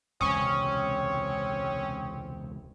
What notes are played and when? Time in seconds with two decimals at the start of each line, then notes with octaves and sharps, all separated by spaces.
0.21 E1 C#2 C3 C4 C#4 C#6 D#6